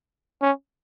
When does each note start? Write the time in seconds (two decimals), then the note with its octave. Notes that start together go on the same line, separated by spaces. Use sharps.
0.42 C#4